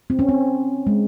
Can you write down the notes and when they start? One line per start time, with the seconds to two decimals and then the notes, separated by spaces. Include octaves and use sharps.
0.10 C4
0.19 C#4
0.29 C4
0.87 G#3